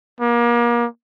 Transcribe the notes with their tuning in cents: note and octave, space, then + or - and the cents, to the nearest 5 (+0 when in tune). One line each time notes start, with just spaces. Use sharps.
A#3 +35